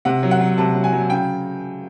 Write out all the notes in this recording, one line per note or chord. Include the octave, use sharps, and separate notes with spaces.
C3 F#5
F#3
F#5
F#3
C3 A5
F#3
G#5
F#3
C#3 G5